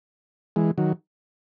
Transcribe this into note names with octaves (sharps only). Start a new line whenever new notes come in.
E3 G#3
D#3 F#3